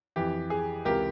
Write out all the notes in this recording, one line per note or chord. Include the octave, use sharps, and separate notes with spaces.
F2 E3 G4
G#4
C#2 C3 E3 G4 A#4